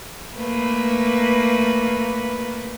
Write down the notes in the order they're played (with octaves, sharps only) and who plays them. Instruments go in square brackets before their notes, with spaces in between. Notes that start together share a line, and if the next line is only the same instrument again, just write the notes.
[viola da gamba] A3 A#3 B4